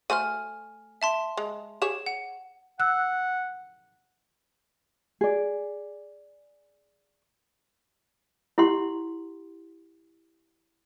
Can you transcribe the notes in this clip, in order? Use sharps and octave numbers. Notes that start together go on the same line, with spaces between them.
A3 F#4 C5 G#5 F6
E5 A5 C6
G#3
G4 G#4 C#5 E7
F#5
F#5 E6 F#6
G#4 D5
E4 G4 F#5 C6